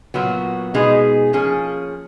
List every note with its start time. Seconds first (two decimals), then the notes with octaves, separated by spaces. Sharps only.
0.14 A#2 F#3 B3 F#4
0.74 B2 G#3 D#4 G#4
1.33 F3 A#3 C#4 G#4